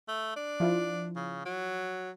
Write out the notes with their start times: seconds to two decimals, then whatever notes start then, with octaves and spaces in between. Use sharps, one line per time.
0.08 A3
0.36 D4
0.60 F3 E4 F4
1.16 C#3
1.46 F#3